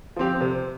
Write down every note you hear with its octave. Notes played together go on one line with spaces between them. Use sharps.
F3 C4 G4
C3